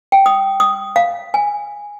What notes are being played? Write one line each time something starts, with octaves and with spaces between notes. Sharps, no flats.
G5
D#6
D#6
F5
G#5